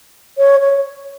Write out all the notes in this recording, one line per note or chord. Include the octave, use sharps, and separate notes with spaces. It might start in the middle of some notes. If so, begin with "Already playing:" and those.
C#5
C#5